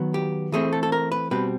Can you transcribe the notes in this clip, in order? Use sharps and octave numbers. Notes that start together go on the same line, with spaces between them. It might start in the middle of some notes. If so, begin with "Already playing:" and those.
Already playing: D#3 F#3 B3
G4
E3 A3 C4 G#4
A4
A4
A#4
B4
B2 G3 C4 B4